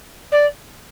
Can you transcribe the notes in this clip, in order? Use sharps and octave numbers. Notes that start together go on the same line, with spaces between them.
D5